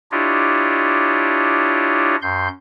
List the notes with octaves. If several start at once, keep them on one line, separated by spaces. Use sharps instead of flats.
D4 E4 F4 G4 C#5 D#5
F#2 C6 G6